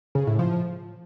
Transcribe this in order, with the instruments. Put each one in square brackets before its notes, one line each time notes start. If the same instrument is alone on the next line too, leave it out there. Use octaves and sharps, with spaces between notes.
[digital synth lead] C#3
A2
F3